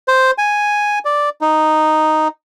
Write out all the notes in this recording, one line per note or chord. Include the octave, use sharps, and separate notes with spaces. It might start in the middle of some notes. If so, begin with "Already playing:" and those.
C5
G#5
D5
D#4